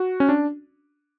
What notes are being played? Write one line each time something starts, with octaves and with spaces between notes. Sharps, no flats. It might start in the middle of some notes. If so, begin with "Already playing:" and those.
Already playing: F#4
C#4
D4